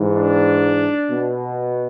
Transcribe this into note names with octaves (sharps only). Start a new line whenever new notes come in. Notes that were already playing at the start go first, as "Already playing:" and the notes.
Already playing: G#2 E3
D4
B2